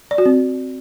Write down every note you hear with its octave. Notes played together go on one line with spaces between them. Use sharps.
D5
F#4
C4